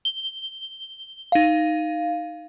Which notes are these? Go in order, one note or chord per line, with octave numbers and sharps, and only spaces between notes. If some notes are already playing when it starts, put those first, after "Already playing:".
G7
D#4 F5